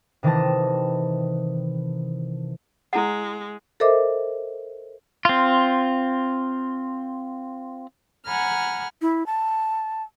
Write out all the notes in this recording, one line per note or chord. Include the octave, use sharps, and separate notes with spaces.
C3 D#3 E3 G4 D#5 A5
G#3 E4 F#5
A4 A#4 C5 D#5 E5 D6
C4 F4
F#5 G#5 A#5 B5 F6
E4
A5